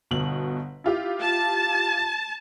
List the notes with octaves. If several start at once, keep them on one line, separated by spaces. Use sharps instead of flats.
G1 B2 F#7
E4 F4 G4
A5